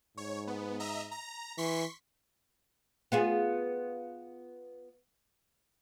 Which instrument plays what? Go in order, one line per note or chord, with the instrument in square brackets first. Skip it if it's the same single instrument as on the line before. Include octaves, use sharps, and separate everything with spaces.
[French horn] G#2 [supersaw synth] C#5
[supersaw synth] B3
D#5 E5 A#5
A#5
[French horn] E3 [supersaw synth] C6 C#6 B6
[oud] B3 F4 G#4